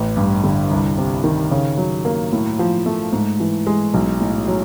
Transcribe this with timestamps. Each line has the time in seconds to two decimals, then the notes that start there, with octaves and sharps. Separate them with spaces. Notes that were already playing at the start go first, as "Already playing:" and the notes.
Already playing: A1
0.17 G2
0.44 D3
0.71 C2
0.98 C3
1.24 D#3
1.51 C#3
1.78 F#3
2.05 A#3
2.33 A2
2.59 F3
2.86 A3
3.12 G#2
3.40 E3
3.67 G#3
3.94 B1
4.20 A2
4.48 F#3